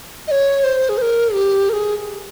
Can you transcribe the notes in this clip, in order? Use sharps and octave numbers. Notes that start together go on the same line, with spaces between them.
D#5
C#5
C5
G#4
C5
A#4
G4
A#4
G#4